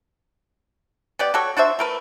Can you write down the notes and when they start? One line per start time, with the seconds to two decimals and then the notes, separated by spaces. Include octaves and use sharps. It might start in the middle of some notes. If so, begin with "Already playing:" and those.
1.19 B3 G4 D5
1.34 F#4 G4 A4 C#5
1.57 D4 F#4 C5 E5
1.79 A3 A#4 B4